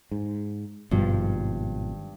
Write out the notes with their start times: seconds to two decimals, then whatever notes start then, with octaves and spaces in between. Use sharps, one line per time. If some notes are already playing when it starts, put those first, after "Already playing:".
0.11 G#2
0.91 G#1 G2 B2 F3